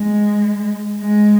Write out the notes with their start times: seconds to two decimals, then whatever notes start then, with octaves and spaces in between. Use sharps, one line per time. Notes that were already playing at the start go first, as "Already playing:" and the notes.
Already playing: G#3
1.01 G#3